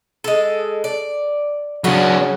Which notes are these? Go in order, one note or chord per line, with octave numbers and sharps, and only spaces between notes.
G#3 A4
D5
C#3 F#3 C#4 D4 F#4